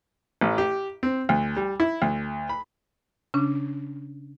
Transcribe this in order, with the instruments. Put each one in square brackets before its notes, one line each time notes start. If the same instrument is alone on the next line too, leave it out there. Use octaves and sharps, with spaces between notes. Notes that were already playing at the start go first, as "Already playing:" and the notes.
[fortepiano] A1
G4
C4
D2
G3
E4
D2
B5
[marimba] C#3 C#4 D4